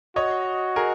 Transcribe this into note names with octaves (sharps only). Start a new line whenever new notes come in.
F#4 C#5 D#5
G#4 A#4